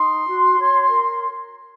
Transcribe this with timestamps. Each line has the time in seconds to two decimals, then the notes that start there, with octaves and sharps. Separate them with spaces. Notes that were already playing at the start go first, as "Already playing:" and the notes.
Already playing: D#4 C6
0.26 F#4
0.57 C#5
0.89 A#4